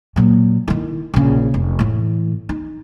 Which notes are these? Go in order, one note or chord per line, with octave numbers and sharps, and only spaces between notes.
A#2 F#3
D#3 E4
A#1 C#3
F1
A2 E3
D#4